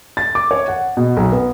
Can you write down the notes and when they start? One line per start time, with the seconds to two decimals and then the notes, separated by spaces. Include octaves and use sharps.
0.17 A6
0.35 D6
0.51 C#5
0.68 F#5
0.97 B2
1.17 B1
1.32 B3